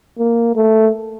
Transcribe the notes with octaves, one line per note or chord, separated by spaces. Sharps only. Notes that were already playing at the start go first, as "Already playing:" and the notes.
A#3
A3